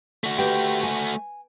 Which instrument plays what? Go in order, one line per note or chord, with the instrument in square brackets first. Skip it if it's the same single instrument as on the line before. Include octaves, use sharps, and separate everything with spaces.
[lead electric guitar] A3 F#4
[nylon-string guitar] G4 B4 G5
G#5